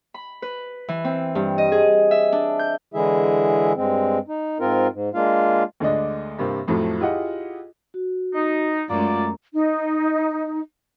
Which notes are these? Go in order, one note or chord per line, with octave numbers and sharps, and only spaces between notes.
B5
B4
E3
C4
G2
D#5
G#4
E5
D4
G6
D3 E3 G#3 E4 G#4 E5
G2 G#3 C4
D#4
G#2 C4 F4 A#4
G#2
G#3 A#3 D4 F4 F5
D2 D3 G#3 D4 D#5
G2 C3 A#3 C4
F2 A2 F3 F#3 A3
E4 F4 G4 G#4 D#5 F#5
F#4
D#4
F#2 G#3 A3 F4 D5 A#5
D#4